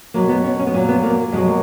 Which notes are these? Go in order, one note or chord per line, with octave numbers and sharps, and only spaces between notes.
B2 F#3 A#3
B3
C#4
C#4
B3
A#2 F#3 C#4
B3
A#3
B2 F#3 G#3
A#3